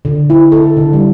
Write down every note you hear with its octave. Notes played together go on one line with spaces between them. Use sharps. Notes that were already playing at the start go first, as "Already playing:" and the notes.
D3
E4
A4
D3
G3